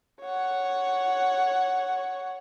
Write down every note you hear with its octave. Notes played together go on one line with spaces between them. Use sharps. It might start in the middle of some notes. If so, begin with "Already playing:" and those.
C#5 F#5